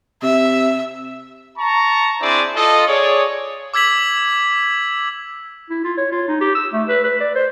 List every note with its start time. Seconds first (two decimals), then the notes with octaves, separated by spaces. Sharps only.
0.23 C3 E5
1.58 A5 A#5 C#6
2.22 C4 D4 E4 G#4 C5 D5
2.56 F4 A4 D#5
2.87 G#4 C#5 D5
3.74 D6 E6 G#6 B6 F#7
5.70 E4
5.84 F4
5.97 C#5
6.12 F4
6.28 D#4
6.40 G4
6.55 E6
6.74 A3
6.89 B4
7.04 B4
7.20 D5
7.35 C5